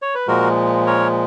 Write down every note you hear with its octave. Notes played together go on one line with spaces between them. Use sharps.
C#5
B4
A#2 F3 G#3 F#4 A#4
A#4 C#5